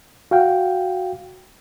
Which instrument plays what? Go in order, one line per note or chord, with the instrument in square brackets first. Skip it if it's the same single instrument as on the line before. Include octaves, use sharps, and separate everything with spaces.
[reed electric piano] F#4 F5 G5